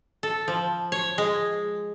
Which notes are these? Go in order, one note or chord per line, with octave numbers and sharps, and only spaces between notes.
A4
F3
C#5
G#3